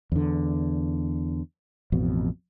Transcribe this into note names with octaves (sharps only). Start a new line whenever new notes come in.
E2 D3
A1 F2 B2